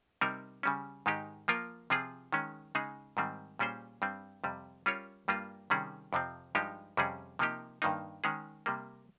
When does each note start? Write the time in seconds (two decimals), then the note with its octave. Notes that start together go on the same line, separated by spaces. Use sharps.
0.21 C3 G3 C4 D#4 A#4
0.63 C#3 G3 C#4
1.06 G#2 D#3 G#3 D#4 G4
1.48 F3 A#3 F4 A#4
1.90 C3 F3 C4 F4 G#4
2.33 D#3 G#3 C#4
2.75 C#3 G#3 D#4 G#4
3.17 G#2 D#3 G3 C4
3.59 A#2 G3 C#4 G#4 C5
4.02 G2 G3 C4
4.44 F2 C3 G3
4.86 G3 C#4 F4 A#4 C#5
5.28 G2 G3 A#3 F4
5.70 C3 D#3 G3 C#4 G#4
6.13 F2 C3 F3 C4
6.55 G2 F3 G#3 D#4 G4
6.97 F2 C3 G3 C#4 G#4
7.39 C3 F3 A#3 D#4 G4
7.82 G2 D#3 A#3 D#4
8.24 D#3 G#3 C#4 G#4
8.66 C3 G3 A#3